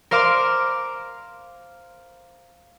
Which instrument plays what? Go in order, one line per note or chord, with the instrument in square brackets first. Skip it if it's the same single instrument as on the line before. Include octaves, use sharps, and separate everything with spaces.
[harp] A#4 C5 F5 C6 D6